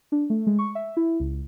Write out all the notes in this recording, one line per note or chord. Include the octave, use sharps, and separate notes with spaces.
D4
A3
G#3
C#6
E5
E4
C#2